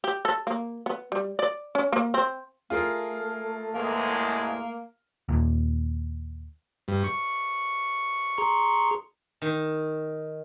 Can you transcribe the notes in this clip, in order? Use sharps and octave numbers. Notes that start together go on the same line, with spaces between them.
G4
A4
A#3
B3
G3
D5
C#4
A#3
C4
A3 F4 G#4 A#4
A1 E2 G#3 A#3
D#2 A#2
G2
C#6
G#4 A#5 C6
D#3